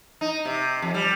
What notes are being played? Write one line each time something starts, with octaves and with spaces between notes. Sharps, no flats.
D#4
C3
F2
G3